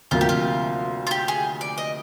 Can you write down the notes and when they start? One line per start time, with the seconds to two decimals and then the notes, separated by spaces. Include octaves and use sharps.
0.11 D2 C3 F3 A#3 F4
0.21 G4
0.29 F4
1.07 F4
1.11 G4
1.28 G#4
1.61 D5
1.78 D#5